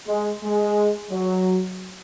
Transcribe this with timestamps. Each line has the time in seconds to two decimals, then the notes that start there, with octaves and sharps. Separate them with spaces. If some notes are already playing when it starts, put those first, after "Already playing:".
0.08 G#3
0.43 G#3
1.11 F#3